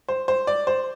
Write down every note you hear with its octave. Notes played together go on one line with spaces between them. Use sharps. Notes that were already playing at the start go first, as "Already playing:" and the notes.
C5
C5
D5
C5